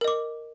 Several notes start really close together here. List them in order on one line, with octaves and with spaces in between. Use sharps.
A#4 D#5 D6